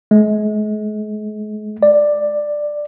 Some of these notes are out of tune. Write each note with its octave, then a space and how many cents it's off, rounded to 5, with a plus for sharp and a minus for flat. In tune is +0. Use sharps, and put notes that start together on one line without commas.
G#3 +40
D5 +10